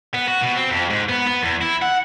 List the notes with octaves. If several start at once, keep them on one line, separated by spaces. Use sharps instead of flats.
B3
F#4
B2
C4
F2
G#2
B3
B3
E2
E4
F#5